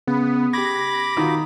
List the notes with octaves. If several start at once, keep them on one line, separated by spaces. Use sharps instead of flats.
C#3 B3
G4 B5 D6 G#6 A#6
D#3 F4 F#4